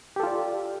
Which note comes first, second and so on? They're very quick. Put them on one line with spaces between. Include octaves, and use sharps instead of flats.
G4 A4 F4 D5